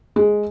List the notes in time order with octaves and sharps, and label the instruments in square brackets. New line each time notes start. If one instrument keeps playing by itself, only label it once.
[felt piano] G#3